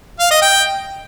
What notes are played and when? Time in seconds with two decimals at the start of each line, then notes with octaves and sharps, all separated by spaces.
0.20 F5
0.31 D#5
0.42 G5